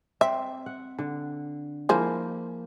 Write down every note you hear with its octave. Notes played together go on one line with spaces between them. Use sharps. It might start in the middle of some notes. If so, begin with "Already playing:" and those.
C4 E5
F#5
D3
F3 A#3 E4 G#4 C5